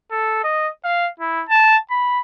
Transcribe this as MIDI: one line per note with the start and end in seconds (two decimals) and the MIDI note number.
0.11 0.42 69
0.44 0.69 75
0.85 1.07 77
1.20 1.44 64
1.49 1.77 81
1.91 2.21 83